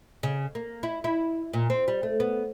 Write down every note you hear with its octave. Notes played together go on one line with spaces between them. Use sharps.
C#3
A#3
E4
E4
A#2
C4
G3
A3
B3